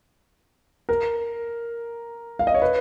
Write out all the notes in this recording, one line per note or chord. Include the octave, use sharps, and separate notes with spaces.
A#4
F5
D#5
C#5
B4